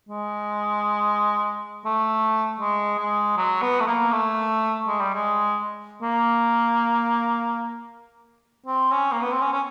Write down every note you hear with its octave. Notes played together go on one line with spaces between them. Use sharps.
G#3
A3
G#3
G#3
F#3
B3
A3
A#3
A3
G#3
G3
G#3
A#3
C4
C#4
A#3
B3
C4
C#4
C#4